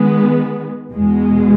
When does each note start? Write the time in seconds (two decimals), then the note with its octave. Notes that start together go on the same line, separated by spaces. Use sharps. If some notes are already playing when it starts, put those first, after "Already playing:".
Already playing: D#3 G#3 B3
0.91 E2 B2 G#3